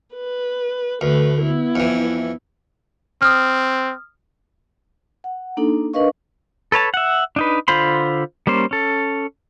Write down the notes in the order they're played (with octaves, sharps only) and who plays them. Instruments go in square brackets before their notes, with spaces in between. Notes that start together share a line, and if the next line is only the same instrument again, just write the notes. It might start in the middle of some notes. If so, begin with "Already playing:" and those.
[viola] B4
[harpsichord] D2 [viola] A3 B4
[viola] B3 E4
[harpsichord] F2 E3
[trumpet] C4 [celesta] D#6 F6
[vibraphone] F#5
A#3 D4 D#4 A4
D4 A#4 B4 D#5 F5 C#6
[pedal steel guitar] A4 B4 C#5 A5
E5 F#5
D4 D#4 B4
D3 F4 C5 B5 C6
G3 A#3 C#4 C5
C#4 A4